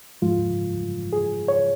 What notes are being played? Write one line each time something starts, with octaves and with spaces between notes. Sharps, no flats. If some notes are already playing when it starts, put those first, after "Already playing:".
G#2 F3 G#3 F4
G#4
C#5